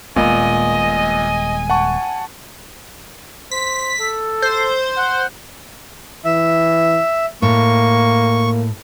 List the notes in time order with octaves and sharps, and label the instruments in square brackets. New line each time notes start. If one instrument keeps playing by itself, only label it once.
[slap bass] D#1 G#3 B3 [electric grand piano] A#2 [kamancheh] D#5 [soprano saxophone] G#5
[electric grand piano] F#5 A5 C#6
[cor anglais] C5 [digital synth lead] B6
[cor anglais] A4
[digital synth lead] C5
[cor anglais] F#5
[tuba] E3 [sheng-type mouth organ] E5
[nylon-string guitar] A2 [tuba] A#3 [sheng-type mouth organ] C#6